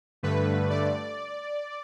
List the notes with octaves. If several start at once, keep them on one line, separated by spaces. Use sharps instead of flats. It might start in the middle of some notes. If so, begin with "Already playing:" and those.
G2 D3 A3 B4
D5